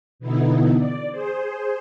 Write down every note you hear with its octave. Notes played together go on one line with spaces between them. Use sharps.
B2 D3 E3 B3 D#4 E4
D5
G#4 C5